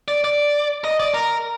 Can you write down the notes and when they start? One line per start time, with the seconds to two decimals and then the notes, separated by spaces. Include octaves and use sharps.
0.08 D5
0.24 D5
0.84 D#5
1.00 D5
1.14 A#4